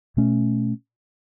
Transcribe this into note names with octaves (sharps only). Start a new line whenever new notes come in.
B2 A3 C#4